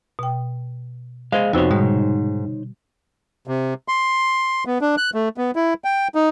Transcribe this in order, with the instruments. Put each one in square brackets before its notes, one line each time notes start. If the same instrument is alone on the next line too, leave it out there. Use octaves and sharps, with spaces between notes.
[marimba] B2 G5
[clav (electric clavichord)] G#3 [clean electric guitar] G#4 C5 F5
[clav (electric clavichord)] F2 B3 [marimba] C3 F#4 [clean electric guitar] D#4 C5 C#5
[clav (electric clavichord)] G#2 [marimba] B2 D3 G3
[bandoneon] C3
C6
B3
D4
F#6
A3
B3
E4
G5
D#4